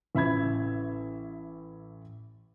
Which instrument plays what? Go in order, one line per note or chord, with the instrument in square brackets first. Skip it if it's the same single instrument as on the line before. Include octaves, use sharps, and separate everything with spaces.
[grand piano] A1 E5 B5 G#6